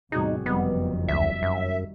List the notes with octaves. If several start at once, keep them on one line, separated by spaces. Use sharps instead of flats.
E2 A2 C3 G3 D#4 F#4 G#4
F#1 F2 D#3 G3 B3
D2 E5
F#2